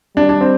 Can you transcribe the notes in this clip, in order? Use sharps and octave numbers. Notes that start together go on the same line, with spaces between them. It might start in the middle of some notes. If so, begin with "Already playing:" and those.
G3 D4
D4
C4